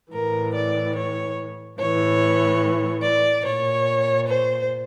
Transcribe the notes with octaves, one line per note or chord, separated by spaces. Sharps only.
A2 E3 A#4
D5
C#5
A2 E3 C#5
D5
A#2 C#5
C5